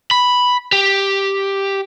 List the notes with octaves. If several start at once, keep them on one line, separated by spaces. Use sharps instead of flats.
B5
G4